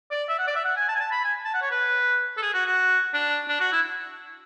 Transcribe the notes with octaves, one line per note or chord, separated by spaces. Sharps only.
D5
E5
F#5
D5
E5
F#5
G#5
A5
G#5
A5
B5
G#5
A5
F#5
C#5
B4
A4
G#4
F#4
F#4
D4
D4
F#4
E4